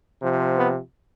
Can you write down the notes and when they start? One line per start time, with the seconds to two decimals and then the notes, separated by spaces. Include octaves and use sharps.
0.23 C3 F3
0.58 B3